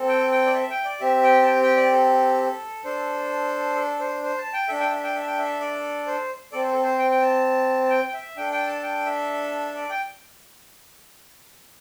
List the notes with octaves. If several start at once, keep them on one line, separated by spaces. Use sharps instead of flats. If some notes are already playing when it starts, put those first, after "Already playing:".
Already playing: C4 A4
G5
G5
D5
E5
G5
D5
C4 G4 E5
G5
A5
G5
G5
D5
A4
D4 A4 C5
A4
C5
C5
A5
G5
D4 A4 E5
G5
E5
G5
E5
G5
E5
D5
C5
C4 A4 D5
C5
A4
C5
G5
G5
A5
A5
G5
G5
E5
D4 A4 G5
G5
A5
G5
E5
D5
G5